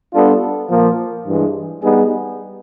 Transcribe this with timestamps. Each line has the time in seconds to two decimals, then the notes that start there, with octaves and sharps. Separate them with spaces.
0.13 G3 B3 D4 F4 A4
0.69 A#2 F3 A#3
1.25 G2 E3 G#3
1.82 G3 B3 D#4 G#4